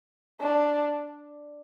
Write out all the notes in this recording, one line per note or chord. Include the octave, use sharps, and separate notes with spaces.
D4